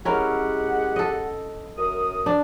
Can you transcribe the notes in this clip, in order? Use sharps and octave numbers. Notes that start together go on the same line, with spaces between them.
G#3 C#4 E4 G4 A#4 F#5
A4 D#5
F#2 A#4 D#6
D4